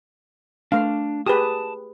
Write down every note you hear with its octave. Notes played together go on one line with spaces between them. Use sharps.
A3 D4 F5
G4 G#4 B4 A5 D#6